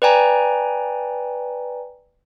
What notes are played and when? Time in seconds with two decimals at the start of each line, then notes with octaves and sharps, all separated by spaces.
0.02 B4 D5 G5 G#5 A#5